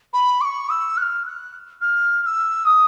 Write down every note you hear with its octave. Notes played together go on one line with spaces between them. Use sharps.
B5
D6
C#6
E6
F#6
F6
F#6
F6
F6
E6
D#6